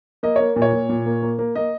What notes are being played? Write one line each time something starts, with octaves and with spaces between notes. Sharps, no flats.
A#3 D#5
A#3 C#5
A#2
C#5
A#2
A#2
A#3
A#3
A#3
A#3 D#5